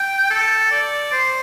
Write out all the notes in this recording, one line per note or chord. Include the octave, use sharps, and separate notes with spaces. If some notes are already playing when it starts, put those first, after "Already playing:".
Already playing: G5
A4
D5
C5